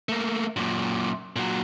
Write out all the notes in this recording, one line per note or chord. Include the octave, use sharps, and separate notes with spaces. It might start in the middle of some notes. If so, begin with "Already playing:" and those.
A3 A#3
F#2 A#2
A#2 F#3